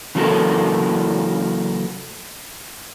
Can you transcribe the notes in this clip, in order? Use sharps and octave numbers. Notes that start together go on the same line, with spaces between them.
C#3 E3 F#3 A#3 E4 A4